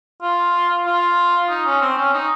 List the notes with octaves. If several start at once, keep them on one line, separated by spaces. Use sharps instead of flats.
F4
F4
D#4
C#4
C4
C#4
D#4